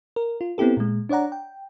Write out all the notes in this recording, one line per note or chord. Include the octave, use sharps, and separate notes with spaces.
A#4
F4
B3 C4 E4 G4 A4
A#2 G#3
D4 C#5 D5 F#5 A#5
G5